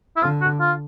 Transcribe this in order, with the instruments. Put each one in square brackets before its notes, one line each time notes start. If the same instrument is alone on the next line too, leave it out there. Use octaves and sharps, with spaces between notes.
[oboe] E4
[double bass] D3 [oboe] F4
[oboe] F#4
F4